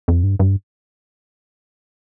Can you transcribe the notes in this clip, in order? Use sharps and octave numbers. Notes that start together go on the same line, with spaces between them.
F2
G2
G2